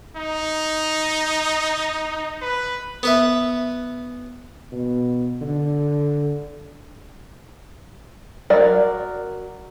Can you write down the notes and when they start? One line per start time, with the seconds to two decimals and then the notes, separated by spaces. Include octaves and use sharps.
0.16 D#4
2.42 B4
3.03 B3 B4 E5
4.72 B2
5.42 D3
8.50 F#3 A#4 D5